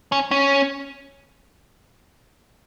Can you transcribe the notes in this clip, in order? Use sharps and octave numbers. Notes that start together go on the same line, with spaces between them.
C#4
C#4